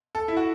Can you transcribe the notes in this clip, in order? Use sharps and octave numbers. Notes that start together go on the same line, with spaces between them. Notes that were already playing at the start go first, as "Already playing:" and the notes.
A4
E4
F#4